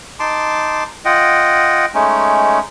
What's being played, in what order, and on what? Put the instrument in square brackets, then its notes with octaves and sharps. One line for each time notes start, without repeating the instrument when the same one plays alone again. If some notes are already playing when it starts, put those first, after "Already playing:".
[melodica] D#4 A5 C6 D6
F4 D#5 F#5 G5
G#3 A3 C#4 D#4